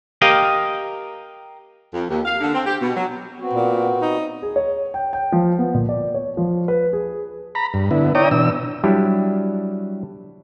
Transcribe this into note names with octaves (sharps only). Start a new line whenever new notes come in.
G4 A#4 D#5 F5 G5
F2
D#2
F5
D3
C4
G4
B2
F#3
B3 C4 F#4
A#2
D#4
G#4
C#5
G5
G5
F3
B3
A#2
D5
C#5
F3
B4
G#4
A#5 B5
G2
D3 B3 E4
E4 C#5 D5 G5 A#5 D#6
B2 E3 D4 E6
F#3 G3 D4 E4 G4